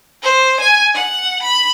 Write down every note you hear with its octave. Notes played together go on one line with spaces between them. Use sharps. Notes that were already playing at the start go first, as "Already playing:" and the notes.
C5
G#5
F#5
B5